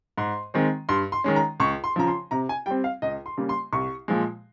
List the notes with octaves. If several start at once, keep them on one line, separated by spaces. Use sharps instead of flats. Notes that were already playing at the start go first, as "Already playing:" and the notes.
G#2 C6
D#3 G#3 C4
G2 C6
C6
D#3 G#3 C#4
A#5
C#2 C#6
C6
C#3 F3 A#5
C6
C3 A#5
G#5
G3 C4 G5
F5
C#2 D#5
C6
C#3 G3 A#3
C6
C2 C#6
A#2 F3 G#3